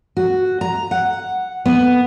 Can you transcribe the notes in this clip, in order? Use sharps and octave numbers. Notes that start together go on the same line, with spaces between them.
F#4
A#5
F#5
B3